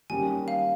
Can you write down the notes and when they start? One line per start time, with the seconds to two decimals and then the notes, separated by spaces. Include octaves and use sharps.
0.10 D#3 G3 A#3 C#4 G4 G#5
0.48 F5